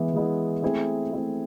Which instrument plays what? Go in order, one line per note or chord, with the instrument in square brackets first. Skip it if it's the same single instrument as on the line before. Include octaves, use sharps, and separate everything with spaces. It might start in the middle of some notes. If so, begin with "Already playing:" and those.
Already playing: [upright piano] E3 G#3 B3 E4
E3 G#3 B3 E4
A3 C4 E4 G#4
A3 C4 E4 G#4